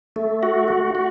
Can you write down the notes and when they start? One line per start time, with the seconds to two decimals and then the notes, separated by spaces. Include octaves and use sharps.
0.16 A3
0.43 F#4
0.68 F#4
0.95 F#4